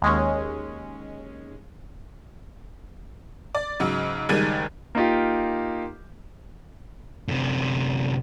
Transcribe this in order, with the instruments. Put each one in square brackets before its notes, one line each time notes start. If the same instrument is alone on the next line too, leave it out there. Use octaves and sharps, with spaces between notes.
[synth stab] D#2 G#3 C#4
[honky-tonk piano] D5
G#2 C#3 F#3
F#1 D#3 G3 G#3 G#6 D#7
[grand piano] A#3 D#4 F4 G4
[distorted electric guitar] F#2 C3